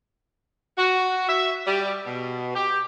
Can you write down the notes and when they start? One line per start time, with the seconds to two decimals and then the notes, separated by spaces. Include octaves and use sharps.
0.78 F#4
1.28 E5
1.66 G3
2.06 B2
2.55 G4